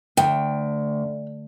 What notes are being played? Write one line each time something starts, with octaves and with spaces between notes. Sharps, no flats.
D2 G5